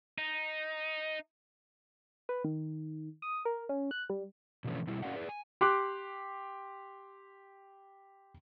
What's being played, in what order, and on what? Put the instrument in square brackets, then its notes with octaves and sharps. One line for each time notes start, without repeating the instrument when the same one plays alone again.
[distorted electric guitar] D#4
[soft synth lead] B4
D#3
D#6
A#4
C#4
F#6
G3
[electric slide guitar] B2 D3 E3 F3 A3 C#4
B2 G3 E4
C#4 F#4 A#4 D5 F5 F#5
G#4 B4 D5
G#5
[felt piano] G4 C6 D6 F#6